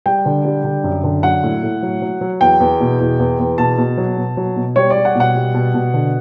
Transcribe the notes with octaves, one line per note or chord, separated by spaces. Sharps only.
G3 G5
D3
G3
D3
F#2
D3
F#3 F#5
A2
A2
F#3
F#3
F#3
E2 G5
E2
B2
E2
E2
E2
B2 A5
B2
F#3
B2
F#3
B2
G3 C#5
G3 D5
F#5
B2 F#5
G3
B2
B2
D3